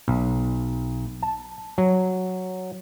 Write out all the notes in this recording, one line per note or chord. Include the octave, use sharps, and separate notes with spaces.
B1
A5
F#3